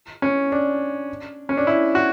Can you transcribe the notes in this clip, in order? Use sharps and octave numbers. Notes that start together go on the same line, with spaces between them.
C#4
D4
C#4
D4
E4
F#4